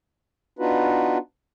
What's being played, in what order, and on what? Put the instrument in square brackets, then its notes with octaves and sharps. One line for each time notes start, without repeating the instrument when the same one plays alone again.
[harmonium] B3 D4 D#4 F4 F#4 B4